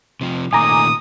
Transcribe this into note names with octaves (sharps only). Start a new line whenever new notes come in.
C3 F3
A#2 D#3 A3 G#5 A#5 D6 D#6